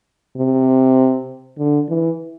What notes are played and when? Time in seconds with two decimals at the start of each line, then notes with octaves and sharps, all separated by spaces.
0.36 C3
1.58 D3
1.88 E3